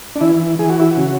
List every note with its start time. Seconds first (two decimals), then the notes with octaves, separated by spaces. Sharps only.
0.16 D4
0.21 E3 E4
0.59 E3 G#4
0.69 F#4
0.80 E4
0.91 F#4
0.97 C#3